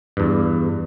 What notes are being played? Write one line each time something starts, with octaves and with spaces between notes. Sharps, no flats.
E2 G2